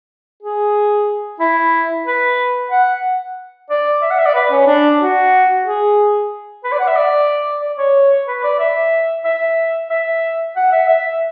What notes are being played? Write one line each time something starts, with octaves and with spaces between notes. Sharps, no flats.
G#4
E4
B4
F#5
D5
E5
F#5
E5
D5
B4
C#4
D4
F#4
G#4
B4
D5
F#5
E5
D5
D5
C#5
B4
D5
E5
E5
E5
F#5
E5
E5